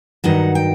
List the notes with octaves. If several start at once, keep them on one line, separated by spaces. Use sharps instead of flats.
G2 D#3 F#3 D#4 F#5
G5